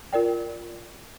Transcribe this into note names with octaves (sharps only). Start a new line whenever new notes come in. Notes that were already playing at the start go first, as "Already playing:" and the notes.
F4 A#4 D5 G5